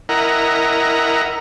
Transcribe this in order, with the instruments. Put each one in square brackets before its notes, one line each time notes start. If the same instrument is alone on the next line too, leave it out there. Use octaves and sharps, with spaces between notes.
[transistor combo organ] E4 A#4 D#5 F#5 A#5